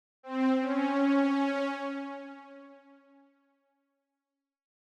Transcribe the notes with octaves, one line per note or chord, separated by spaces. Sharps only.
C4
C#4